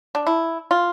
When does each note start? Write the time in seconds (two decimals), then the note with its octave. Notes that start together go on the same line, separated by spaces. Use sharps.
0.15 D4
0.27 E4
0.71 F4